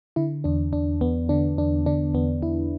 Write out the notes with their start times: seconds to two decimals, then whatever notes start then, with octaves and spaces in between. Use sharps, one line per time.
0.16 D3 E4
0.44 E2 D4
0.73 E2 D4
1.01 E2 B3
1.29 D3 D4
1.58 E2 D4
1.86 D3 D4
2.14 E2 B3
2.42 E2 E4